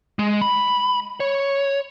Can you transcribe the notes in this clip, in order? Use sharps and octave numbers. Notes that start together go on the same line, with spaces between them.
G#3
B5
C#5